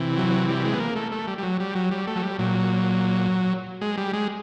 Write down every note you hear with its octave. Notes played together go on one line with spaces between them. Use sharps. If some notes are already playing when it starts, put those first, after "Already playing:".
Already playing: C3 E3
F#3
G3
G#3
B3
A#3
A3
A3
G3
G3
F#3
G3
F#3
G3
A3
F#3
G3
A#2 F#3
G#3
G3
G#3